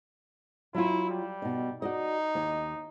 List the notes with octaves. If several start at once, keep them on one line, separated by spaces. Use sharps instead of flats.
F#3 E4 F4
G3
B2 D#4
D#4 F#4 D5 D#5
D#2